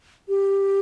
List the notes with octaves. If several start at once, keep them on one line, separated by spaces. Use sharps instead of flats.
G4